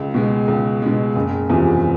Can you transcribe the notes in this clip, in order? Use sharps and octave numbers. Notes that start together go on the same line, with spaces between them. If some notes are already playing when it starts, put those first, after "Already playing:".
Already playing: C#2
B2 G#3
C#2
B2 G#3
F#1
E2 C3 F3